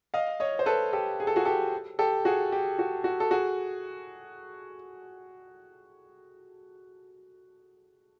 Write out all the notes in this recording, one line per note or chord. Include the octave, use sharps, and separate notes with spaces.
D#5 F5
C#5 D#5
C5
A4 B4
G4 A4
G#4
A4
F#4 G#4
G4 A4
G4 A4
F#4 G#4
G4
F#4
F#4
A4
F#4 G#4